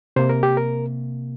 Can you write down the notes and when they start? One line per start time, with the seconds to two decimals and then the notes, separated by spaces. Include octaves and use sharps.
0.16 C3 A#3 C5
0.29 A#4
0.43 G4
0.57 A#4